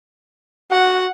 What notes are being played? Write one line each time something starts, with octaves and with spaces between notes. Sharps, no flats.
F#4 F#5